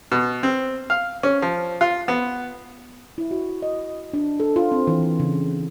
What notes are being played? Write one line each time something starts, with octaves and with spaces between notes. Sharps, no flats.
B2
C4
F5
C#4
F3
F4
B3
E4
F#4
D#5
D4
A4
F4
C4
E3
C#3